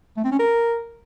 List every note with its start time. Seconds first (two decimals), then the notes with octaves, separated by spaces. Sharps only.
0.17 A3
0.24 C4
0.32 C#4
0.39 A#4